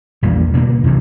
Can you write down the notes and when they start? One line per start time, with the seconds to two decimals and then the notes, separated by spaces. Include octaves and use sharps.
0.22 A#1 E2 G3 A#3
0.54 B2 D3 G#3 A#3
0.84 D#2 C3 E3